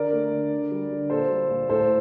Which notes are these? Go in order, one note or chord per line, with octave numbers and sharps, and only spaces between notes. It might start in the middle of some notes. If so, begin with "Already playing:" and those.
Already playing: D3 A#4 D5
A3
D3
D3
G3
D3
A#2 A4 C5
G3
A#2
A2 A4 C5